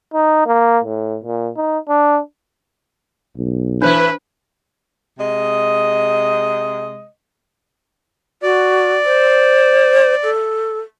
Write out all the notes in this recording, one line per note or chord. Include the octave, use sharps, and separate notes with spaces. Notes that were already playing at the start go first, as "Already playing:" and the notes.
D#4
A#3
A2
A#2
D#4
D4
B1
A2 E3 D4 E4 B4 C5
C3 G#3 D#5
F#4 D5
C5
A4